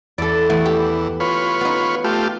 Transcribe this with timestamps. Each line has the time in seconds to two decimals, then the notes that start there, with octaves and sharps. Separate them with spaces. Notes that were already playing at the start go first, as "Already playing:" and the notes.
0.18 E2 A4 D5
0.50 E3 A3 B3
0.66 G4
1.20 F4 B4 C#5
1.61 B3 D#4
2.04 A3 F4 G4